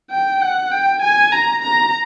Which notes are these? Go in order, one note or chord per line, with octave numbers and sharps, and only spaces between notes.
G5
F#5
G5
G#5
A#5
A#5